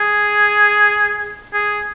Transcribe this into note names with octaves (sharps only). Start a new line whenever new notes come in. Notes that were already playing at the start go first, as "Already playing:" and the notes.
Already playing: G#4
G#4